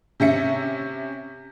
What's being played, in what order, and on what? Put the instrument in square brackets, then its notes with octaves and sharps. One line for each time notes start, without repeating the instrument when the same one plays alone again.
[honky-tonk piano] C3 C#4 E5 C#7